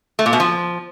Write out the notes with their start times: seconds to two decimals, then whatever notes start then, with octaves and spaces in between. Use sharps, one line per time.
0.19 A3
0.26 A#2
0.33 B2
0.40 F3